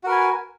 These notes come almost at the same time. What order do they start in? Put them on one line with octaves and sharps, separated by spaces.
F#4 A#4 B4 G#5